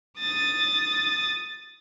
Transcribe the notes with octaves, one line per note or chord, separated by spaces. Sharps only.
D#6 A6